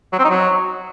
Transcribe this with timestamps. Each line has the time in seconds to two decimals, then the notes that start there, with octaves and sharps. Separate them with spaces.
0.13 F#3
0.18 C4
0.24 D#4
0.30 F#3